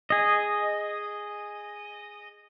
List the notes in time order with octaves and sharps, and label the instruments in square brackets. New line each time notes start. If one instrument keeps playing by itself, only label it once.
[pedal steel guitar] G#4 D#5